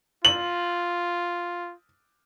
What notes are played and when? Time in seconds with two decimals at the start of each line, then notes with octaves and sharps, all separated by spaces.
0.25 F4 F#7